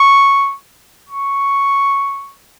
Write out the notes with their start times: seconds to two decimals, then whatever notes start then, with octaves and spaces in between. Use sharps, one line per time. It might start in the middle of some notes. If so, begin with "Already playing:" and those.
Already playing: C#6
1.09 C#6